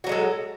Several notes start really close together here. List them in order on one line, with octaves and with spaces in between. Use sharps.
F#4 F#3 G#3 A4